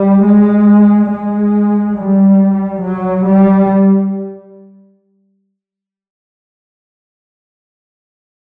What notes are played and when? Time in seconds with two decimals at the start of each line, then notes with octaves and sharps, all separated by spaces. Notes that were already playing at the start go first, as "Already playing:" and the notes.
Already playing: G3
0.23 G#3
1.10 G#3
1.95 G3
2.82 F#3
3.25 G3